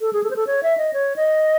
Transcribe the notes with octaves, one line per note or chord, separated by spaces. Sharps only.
A4
G#4
A4
C5
A4
C#5
E5
D#5
C#5
D#5